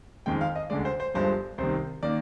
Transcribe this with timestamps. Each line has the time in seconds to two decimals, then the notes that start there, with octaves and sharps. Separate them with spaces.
0.26 F2 D#3 G#3 G5
0.41 F5
0.55 D#5
0.70 D2 D3 G#3 D5
0.85 C5
1.00 C5
1.14 G1 G2 F3 G#3 C5
1.58 C2 C3 D#3 C5
2.03 D#3 A#3 D5